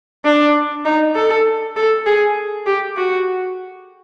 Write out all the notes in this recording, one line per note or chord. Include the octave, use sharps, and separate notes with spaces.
D4
D#4
A4
A4
G#4
G4
F#4